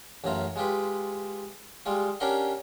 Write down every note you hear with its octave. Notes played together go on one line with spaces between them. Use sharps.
A1 F#2 A2 F4 A#5
G#3 F4 G4 B4
G3 G#3 F4
C#4 D4 G4 A#4 F#5 C6